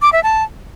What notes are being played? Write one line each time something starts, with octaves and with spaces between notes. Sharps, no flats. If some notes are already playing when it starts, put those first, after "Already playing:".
D6
E5
A5